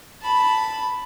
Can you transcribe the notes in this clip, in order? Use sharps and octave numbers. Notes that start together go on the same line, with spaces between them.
A5 B5